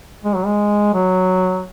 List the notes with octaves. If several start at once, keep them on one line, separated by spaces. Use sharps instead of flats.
G#3
F#3
G#3
F#3